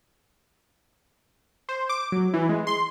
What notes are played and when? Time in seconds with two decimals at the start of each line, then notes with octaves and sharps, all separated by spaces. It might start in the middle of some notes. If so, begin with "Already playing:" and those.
1.69 C5
1.89 D6
2.12 F#3
2.34 E3
2.49 G#3
2.67 C6